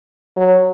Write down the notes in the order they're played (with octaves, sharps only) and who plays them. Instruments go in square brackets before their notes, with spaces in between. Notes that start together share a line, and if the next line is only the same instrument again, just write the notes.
[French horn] F#3